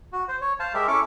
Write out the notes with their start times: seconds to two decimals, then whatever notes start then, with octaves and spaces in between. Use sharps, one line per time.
0.13 F#4
0.28 C5
0.41 C#5
0.60 C5 F5 A5
0.74 G#3 G4 A#4 E5
0.88 C#4 E4 A4 C#6 D6